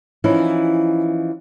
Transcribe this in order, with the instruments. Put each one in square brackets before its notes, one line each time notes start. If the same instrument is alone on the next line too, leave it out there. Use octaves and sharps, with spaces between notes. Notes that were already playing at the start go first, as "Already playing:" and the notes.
[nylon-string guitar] E3 F3 C#4 D#4 E4